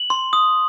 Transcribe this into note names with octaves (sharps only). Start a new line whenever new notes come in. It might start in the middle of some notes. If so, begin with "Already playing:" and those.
Already playing: F#7
C6
D#6